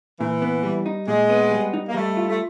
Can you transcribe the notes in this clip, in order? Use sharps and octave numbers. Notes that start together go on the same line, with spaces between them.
A#2 E3
B3
G3
D#4
A#2 G#3
B3
G3
D#4
A#3
G3 A3
F4
A3